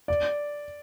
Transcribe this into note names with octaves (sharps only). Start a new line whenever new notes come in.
D5